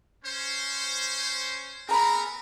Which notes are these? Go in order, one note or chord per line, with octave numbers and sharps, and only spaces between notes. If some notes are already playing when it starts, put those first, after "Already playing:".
C#4 C5
B3 C4 G#4 A#4 A#5 B5